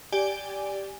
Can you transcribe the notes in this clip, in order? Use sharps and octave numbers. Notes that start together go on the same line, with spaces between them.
G4 D5 G#5